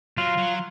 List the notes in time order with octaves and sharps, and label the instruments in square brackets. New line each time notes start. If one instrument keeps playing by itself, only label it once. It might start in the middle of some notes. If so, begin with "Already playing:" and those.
[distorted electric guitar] F#3 [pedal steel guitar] F4
[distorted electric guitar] F#3